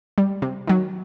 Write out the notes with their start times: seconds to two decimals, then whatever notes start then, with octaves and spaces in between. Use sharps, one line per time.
0.18 G3
0.42 C3
0.67 D#3 F#3